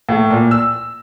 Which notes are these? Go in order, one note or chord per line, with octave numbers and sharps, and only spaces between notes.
A2
A#2
E6